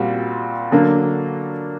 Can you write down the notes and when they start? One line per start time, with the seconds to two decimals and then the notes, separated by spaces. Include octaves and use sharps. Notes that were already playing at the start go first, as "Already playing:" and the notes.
Already playing: A#2 G3 C4 F#4
0.72 D3 F#3 A#3 D4